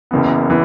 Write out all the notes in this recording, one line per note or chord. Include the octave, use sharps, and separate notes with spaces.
F#1 F#2 E3 B3
E3